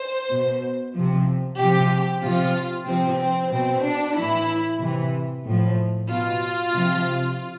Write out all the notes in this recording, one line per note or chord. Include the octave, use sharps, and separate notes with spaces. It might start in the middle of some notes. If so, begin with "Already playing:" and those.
Already playing: C5
B2
C3 F3
C3 F3 G4
C3 F3 F4
C3 F3 C4
C4
B2 C4
D4
A2 E3 E4
C3 E3
A2 F3
B2 F4
C3 F3